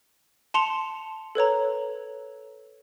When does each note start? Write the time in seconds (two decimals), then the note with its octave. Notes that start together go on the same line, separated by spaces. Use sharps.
0.54 A5 C6 C#7 F7
1.35 A4 B4 C#5 A#5